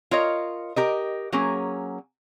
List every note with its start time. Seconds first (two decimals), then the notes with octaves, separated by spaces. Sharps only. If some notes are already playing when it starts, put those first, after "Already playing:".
0.11 F4 A#4 C#5 D#5
0.76 G4 A#4 D#5
1.32 F#3 A#3 C#4 G#4